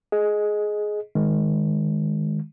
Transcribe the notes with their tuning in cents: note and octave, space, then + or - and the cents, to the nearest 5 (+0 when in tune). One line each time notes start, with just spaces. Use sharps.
G#4 +15 D#5 +0
D#3 +0 G#3 +0